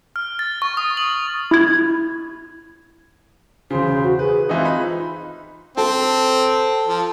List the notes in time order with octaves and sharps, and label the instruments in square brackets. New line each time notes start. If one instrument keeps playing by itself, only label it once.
[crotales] F6
A6
C#6
D#6
F#7
[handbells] E4 G#6
[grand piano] E1 C#3 [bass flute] C5
[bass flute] F#4
[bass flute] G#4 [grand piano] B4
[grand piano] E3 C4 D#4 [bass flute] F4
[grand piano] D#4 B5
[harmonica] C4 [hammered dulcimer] A4
[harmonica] F3